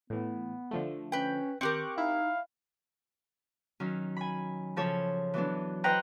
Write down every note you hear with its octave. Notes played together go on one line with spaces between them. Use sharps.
A2 E3 B3
D3 F3 A3
C#4 B4 G5
D#3 C4 G4 A#4 C#6 D6 F#6
D#4 E4 F5
D#3 F#3 C#4
G#5 B5
C#3 F3 A4 C#5
E3 F#3 B3 D4
B4 C5 D#5 F#5 G5 A#5